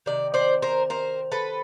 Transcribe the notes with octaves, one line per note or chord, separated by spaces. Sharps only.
C3 D#3 D5
C5 D5
A#4 C5
A#4 C5
A4 B4